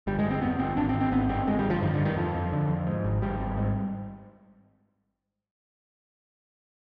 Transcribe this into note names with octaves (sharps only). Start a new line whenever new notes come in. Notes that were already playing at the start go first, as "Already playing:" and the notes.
G1 G3
G#3
G1
C4
F2 B3
G1 C4
G#1 D4
C4
G#1
C4
G#1 B3
G2 C4
G1 G#3
G3
G1
F3
G2 D#3
D3
G2
D#3
F2 F3
F2
D3
F2
G#2
G#1
G#1 G3
G#1
G#2